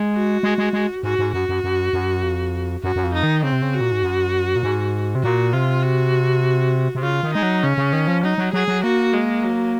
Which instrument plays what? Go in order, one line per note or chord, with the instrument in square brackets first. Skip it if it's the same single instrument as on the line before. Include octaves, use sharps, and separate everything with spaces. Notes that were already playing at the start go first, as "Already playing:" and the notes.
Already playing: [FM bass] G#3
[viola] F#4
[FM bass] G#3
G#3
G#3
[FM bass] G#2 [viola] F#4
[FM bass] G#2
[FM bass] F#2 [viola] F#4
[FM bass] F#2
F#2
F#2
F2
[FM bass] F#2 [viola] F#4
[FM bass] F#2
F2
[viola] D#4
[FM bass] D#3
[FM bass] C#3 [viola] C4
[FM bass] C3
C#3
[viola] F#4
[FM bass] A#2
G#2
F#2
A#2
G#2
C3
[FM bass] A#2 [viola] F#4
[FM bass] C3 [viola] F4
[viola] F#4
[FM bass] C3
[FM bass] C#3 [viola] F4
[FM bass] D#3
[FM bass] G#3 [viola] D#4
[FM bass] F#3
[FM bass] C#3 [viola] C#4
[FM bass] C#3
D#3
F3
[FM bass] F#3 [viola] D#4
[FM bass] F#3
[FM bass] F#3 [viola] G#4
[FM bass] F#3
[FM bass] A#3 [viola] F#4
[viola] G#3
F#3